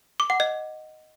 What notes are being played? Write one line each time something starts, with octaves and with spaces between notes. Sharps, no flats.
D6
F#5
D#5